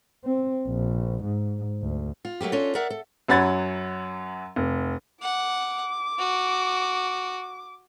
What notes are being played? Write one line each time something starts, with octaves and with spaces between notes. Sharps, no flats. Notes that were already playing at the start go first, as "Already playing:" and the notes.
C4
A#1
G#2
D2
F4
F#3 A3 A#3 G4
C#4 D4 F4 A4
A#4 D5 E5 F#5
A4
F#2 F#3 F#5 B5 G#6 A6
F1
F#5 D6
F#4